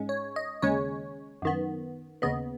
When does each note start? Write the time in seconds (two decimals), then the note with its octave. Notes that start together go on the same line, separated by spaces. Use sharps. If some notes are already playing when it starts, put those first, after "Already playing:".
Already playing: G#2 G#3 C#4
0.09 C#5
0.36 D#5
0.62 D#2 C#3 G#3 C#4 C#5
1.42 F#2 D#3 B3
2.22 D#2 C#3 B3 D#5